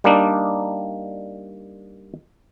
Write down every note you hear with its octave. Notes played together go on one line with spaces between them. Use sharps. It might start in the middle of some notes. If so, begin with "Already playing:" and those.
G3 A#3 D4 D#4